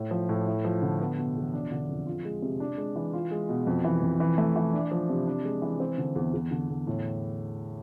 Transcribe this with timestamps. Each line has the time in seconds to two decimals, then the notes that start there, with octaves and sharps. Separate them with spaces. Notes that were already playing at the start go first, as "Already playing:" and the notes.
Already playing: A2
0.11 F3
0.29 A2
0.47 E4
0.65 F3
0.82 D3
1.00 B3
1.18 B2
1.36 E2
1.54 D4
1.72 D3
1.89 F2
2.07 F4
2.25 G#3
2.42 C3
2.60 D4
2.78 G#3
2.96 E3
3.13 F4
3.31 G#3
3.49 B2
3.67 F2
3.84 E3
4.02 F2
4.20 E3
4.38 A3
4.56 E3
4.74 D4
4.91 F3
5.09 C3
5.27 D4
5.45 G#3
5.62 E3
5.80 C4
5.98 D3
6.15 E2
6.34 E2
6.51 D3
6.69 E2
6.87 A2